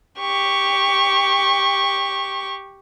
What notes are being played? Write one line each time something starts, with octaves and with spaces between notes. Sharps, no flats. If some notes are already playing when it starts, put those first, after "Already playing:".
G4 C#6